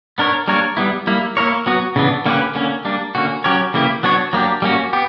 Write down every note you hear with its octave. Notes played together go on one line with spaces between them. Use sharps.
B3 D4 A#4 C#5
G3 A#3 D4 A#4 C#5
G3 B3 E4
G3 A#3 E4
A#3 E4 A#4 C#5
F#3 B3 F#4
C#3 E3 B3 D4
D3 A#3 C#4 G4 B4
D3 A#3 C#4
G3 A#3 D4
D3 A#3 C#4 F#4
F#3 C#4 G4 A#4 C#5
C#3 E3 A#3 E4 G4
F#3 B3 D4 F#4 C#5
F#3 A#3 D4 G4
G3 A#3 C#4 F#4
B3 G4